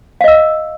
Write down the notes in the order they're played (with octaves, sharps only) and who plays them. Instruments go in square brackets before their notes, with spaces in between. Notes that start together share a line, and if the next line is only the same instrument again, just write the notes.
[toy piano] F5
D#5
E6